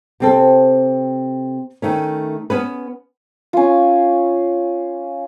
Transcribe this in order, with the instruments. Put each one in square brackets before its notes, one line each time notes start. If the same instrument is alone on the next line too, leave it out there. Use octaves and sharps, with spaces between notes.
[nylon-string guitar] C3 C4 A4
D#3 A3 C#4
B3 C#4 B4
[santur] C#4 F4